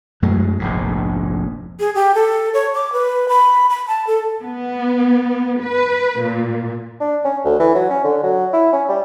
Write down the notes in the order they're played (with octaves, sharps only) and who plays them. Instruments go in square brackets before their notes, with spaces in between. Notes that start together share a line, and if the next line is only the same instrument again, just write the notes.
[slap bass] F#2 F#3 G#3 A3
F1 A#1 G#2
[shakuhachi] G#4
G4
A4
C#5
D6
B4
B5
B5
A5
A4
[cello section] B3
B4
A#2
[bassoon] D4
C#4
D2
E3
F#3
C#4
D3
F#3
E4
C#4
G3